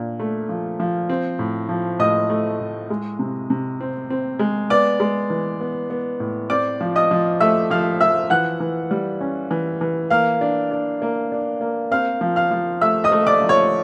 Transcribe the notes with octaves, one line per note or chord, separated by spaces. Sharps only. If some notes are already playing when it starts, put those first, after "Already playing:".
Already playing: A#2 D4
A3
F3
F3
C4
A2
F3
A2 D#5 D#6
A3
A2
G#3
C3
C3
C4
C4
G#3
B3 D5 D6
G#3
E3
B3
B3
A2
C4 D5 D6
F3
D#5 D#6
F3
A3 E5 E6
F3 F5 F6
F3 E5 E6
E3 F#5 F#6
E3
G3
C#4
E3
E3
A#3 F5 F6
D4
D4
A#3
D4
A#3
C4 F5 F6
F3
F5 F6
F3
A3 E5 E6
D#5 D#6
A3
D5 D6
F3
C#5 C#6